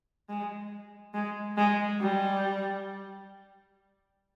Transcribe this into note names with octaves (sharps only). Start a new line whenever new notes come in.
G#3
G#3
G#3
G3